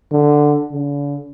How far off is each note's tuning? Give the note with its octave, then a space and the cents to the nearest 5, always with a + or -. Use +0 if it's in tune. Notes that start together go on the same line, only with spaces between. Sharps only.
D3 +5
D3 -45